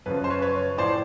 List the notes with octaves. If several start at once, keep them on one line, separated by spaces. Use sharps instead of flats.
F#2 C#3 F3 B4
C5
B4 C#5
B4 C#5
A2 F3 C5 D5